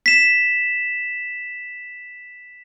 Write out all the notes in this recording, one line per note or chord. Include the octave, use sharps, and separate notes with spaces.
B6 E7